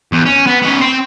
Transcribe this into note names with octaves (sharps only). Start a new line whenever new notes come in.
E2
C#4
B3
B3 C#4
C4 C5